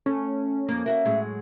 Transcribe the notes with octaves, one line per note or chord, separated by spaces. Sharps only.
A3 C#4
F2 A#3
A#3 F#4 A#4 E5
A2 F#3 G#3